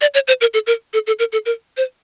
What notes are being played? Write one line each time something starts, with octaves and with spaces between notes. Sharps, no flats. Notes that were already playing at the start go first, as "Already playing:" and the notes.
D5
C#5
C5
A#4
A4
A#4
A4
A4
A#4
A4
A#4
C5